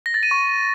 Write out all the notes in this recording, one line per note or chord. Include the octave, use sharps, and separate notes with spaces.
A#6
A6
D#7
C#6